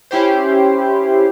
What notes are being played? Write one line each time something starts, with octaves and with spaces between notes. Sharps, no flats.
C#4 E4 G4 C5